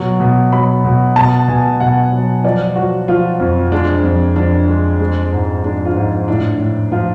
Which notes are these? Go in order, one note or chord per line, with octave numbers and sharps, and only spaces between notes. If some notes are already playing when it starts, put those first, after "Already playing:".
Already playing: B2 F#3 C#6
B2
F#3 B5
B2
B2 A5
B2 G#5
B2 F#5
F#3
F3 D5
F3 F#4
F3 F4
F2
G#3 D4
F2
F2 D4
G#3
G#3
G#2
G#3 D4
F4
G#2
A2 D4
A2
F3 F4